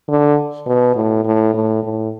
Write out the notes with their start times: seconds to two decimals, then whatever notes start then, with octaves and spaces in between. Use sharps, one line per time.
0.08 D3
0.67 B2
0.96 A2
1.25 A2
1.54 A2
1.83 A2